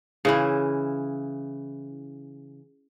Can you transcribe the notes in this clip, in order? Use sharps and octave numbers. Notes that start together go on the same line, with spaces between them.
C#3 E3 E4